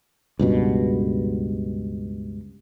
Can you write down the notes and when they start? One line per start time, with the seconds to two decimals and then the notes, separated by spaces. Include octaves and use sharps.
0.39 C#2 G2 B2